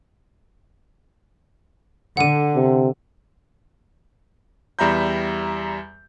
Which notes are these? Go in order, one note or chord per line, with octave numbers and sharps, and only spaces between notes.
D3 F#5 D#7
C3
E2 G3 E5 A#5 B5 G6